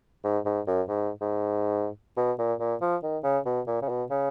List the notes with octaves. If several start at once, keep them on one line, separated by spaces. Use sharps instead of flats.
G#2
G#2
F#2
G#2
G#2
B2
A#2
A#2
F3
D#3
C#3
B2
A#2
C#3
B2
C#3